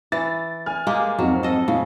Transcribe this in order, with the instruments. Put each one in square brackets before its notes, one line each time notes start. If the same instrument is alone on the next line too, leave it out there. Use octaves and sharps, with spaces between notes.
[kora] E3 [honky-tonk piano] A6
[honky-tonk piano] G#5 F6
[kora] G#3 A#3 G4
[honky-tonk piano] F2 G#2 [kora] F#3
[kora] A4 D#5
[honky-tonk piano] A#2 [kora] C#3